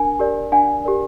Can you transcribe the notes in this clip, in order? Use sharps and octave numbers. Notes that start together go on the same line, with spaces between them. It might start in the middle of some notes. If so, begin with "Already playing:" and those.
Already playing: D4 A#4 G#5
G4 A#4 D5
D4 F#5 G#5
G4 A#4 D5